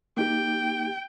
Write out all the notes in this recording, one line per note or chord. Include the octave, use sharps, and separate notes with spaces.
A#3 D#4 G4 G5